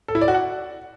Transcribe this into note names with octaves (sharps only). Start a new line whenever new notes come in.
A4
E4
D5
F#4
F#5